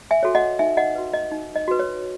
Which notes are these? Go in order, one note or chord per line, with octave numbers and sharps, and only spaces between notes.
E5 G#5
F#4 A4 C#5
D#5 F#5
D#4 E5 G#5
D#5 F#5
F#4 B4
D#5
D#4
D#5
F#4 B4
C#5